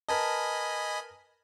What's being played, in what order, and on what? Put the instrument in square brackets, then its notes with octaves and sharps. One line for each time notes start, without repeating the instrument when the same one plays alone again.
[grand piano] A#4 B4 A5 [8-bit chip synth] D#5 G#5 B5